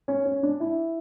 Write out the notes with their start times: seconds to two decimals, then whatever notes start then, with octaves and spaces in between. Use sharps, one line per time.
0.08 C#4
0.25 C#4
0.43 D4
0.60 E4